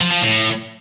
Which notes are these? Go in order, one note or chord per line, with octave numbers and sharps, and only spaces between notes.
F3
F3
A2